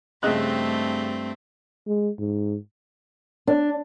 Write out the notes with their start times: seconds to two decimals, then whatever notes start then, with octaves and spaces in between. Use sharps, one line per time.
0.23 G2 C#3 A3 C4 D#5 F#6
1.88 G#3
2.19 G#2
3.47 D4